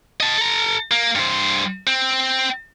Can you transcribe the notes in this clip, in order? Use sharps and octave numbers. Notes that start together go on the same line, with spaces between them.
D#5 A5
A4 A#5
A#3
G2 C5
C4